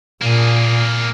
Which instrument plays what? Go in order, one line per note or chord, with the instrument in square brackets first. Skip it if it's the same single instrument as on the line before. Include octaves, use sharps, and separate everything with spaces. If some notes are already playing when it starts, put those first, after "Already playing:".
[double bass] A#2 [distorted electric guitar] A#3 G#4